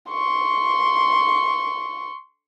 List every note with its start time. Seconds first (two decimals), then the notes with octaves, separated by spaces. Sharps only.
0.11 C6 C#6